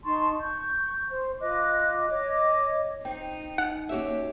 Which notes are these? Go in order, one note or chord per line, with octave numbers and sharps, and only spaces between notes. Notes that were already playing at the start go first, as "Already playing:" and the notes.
D#4 A5 C6 C#6
C#6 G6
C5
F4 D#5 D6 F#6
C#5 D#5 D6
C4 D#4 G5
D#4 F#5
A#3 C#4 F#4 G4 C#5 E5